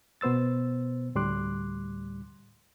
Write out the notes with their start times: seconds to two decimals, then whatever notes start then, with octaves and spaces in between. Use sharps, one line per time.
0.21 B2 B3 C5 E6 A6
1.15 D2 A2 G3 C6 D6 F#6